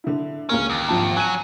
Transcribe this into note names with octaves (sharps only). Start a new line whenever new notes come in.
D3 E4
C#2 A#3 C#4 A#4
D#2
G#1 F3 A5
F#3 G#5 D#7